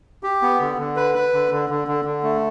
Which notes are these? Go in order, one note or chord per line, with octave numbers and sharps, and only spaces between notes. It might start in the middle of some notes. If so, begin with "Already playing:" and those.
G4
B3
D3
D3
B4
B4
D3
D3
D3
D3
D3
A3